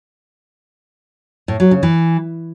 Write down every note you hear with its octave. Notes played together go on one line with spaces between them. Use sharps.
A2
F#3
C#3
E3